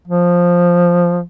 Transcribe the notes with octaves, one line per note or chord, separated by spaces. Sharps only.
F3